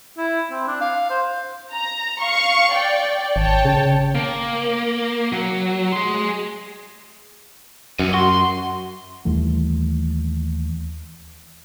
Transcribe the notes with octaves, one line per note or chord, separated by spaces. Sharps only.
E4
C4
D4
F5
C5
A#5
F5 C#6
D5 G5
G#1 C#5 G5 A5
C#3
A#3
F#3
G#4 C6
F#2 C#5 D#5
F#4 C6
D#2 E3 G3 A3